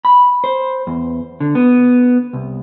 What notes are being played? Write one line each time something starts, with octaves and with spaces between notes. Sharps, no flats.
B5
C5
E2
D3
B3
C2